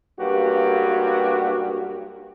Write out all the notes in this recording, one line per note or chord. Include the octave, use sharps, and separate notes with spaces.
B1 G2 A#3 F#4 G4